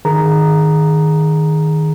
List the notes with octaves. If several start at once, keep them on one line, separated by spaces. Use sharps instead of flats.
D#3 G#4 A#5